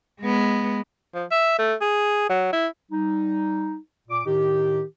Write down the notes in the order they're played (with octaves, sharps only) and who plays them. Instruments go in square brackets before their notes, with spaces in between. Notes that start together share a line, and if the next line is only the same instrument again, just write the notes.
[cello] G#3 B3
[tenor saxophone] F3
E5
A3
G#4
F#3
E4
[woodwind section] G3 D#4
A#2 D6
A2 D#3 D#4 G4